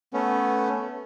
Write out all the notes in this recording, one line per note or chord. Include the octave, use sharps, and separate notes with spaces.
A3 B3 C#4